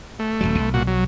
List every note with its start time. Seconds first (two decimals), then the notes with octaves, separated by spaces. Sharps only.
0.19 A3
0.41 D#1 A#1 F#3
0.58 B1
0.74 A#2 F#4
0.88 F#3